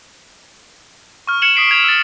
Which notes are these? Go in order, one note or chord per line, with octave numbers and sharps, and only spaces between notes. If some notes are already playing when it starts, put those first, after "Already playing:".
C#6 F6
G#6 C#7 E7 F#7
D#6 B6 C7 D7 F#7
G#6 F7
E6 A6